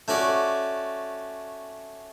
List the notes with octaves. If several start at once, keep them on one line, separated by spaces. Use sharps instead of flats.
A3 C#4 F#4 D5